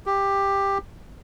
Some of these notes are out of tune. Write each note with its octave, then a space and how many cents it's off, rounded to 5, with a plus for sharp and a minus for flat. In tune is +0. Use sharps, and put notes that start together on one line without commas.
G4 +10